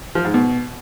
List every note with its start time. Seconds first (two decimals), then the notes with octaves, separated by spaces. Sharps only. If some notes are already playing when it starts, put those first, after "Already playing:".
0.15 F3
0.25 G#2
0.34 B2